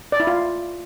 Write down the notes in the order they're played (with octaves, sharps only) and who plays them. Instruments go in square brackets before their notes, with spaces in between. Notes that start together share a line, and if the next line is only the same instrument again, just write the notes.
[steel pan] D5
E4
F4